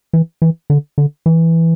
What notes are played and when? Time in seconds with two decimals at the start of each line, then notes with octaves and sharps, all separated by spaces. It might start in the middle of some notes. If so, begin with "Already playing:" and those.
0.13 E3
0.42 E3
0.70 D3
0.98 D3
1.26 E3